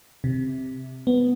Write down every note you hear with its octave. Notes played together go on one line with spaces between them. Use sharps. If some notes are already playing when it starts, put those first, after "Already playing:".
C3
B3